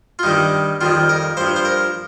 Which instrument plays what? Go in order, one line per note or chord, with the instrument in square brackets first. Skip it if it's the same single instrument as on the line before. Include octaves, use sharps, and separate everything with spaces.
[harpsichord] F4
G2 D#3 G3 D#4
F2 D#3 G3 F4
A#4
G2 F3 C5
C5
A#4